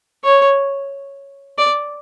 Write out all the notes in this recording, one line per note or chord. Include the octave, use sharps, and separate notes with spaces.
C#5
D5